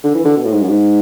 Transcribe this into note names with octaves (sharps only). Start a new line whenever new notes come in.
D3
E3
D3
B2
A2
G#2
F#2
G#2